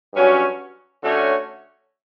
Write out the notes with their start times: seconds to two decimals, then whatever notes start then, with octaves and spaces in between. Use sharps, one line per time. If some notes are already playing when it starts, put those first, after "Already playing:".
0.14 G2 F#3 C#4 F#4
1.03 D3 A3 C#4 F#4 C#5